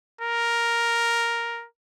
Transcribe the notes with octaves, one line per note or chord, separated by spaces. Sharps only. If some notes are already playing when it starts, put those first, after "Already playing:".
A#4